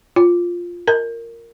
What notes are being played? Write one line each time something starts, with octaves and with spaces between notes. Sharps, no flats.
F4
A#4